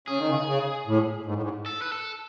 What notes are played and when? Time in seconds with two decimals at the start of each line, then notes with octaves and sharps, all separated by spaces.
0.08 C#3 G#4
0.19 D#3
0.30 C#3
0.47 C#3
0.87 A2
1.26 G#2
1.34 A2
1.42 G#2
1.66 A4
1.82 B4
1.92 A4